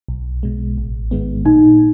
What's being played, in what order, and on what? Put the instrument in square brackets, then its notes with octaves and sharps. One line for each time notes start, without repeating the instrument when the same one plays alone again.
[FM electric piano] B1
B2 G#3
A1
G#2 D#3 G#3 B3
[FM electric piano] A#2 [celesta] D#4